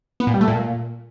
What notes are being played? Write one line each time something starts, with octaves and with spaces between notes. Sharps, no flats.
B3
A#2
G3
A3
A#2